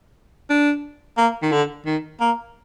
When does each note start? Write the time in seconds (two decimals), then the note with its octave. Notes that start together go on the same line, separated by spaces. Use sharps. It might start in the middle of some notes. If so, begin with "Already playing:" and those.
0.50 D4
1.18 A#3
1.42 D#3
1.52 D3
1.86 D#3
2.21 A#3